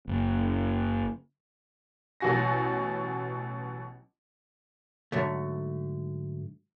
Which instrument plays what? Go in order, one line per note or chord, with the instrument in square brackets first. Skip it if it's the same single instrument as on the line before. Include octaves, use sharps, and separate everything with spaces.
[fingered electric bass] F#1
[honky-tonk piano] A1 B2 F#3 F#4 G#5 A#6
[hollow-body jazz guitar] G#2 D3 F#3 A3